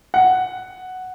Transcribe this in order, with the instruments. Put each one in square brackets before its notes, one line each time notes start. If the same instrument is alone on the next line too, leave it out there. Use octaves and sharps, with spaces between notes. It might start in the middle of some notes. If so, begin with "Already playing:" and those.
[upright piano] F#5